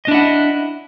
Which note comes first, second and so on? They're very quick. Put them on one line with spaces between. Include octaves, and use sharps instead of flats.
D#5 D4 E4 F#5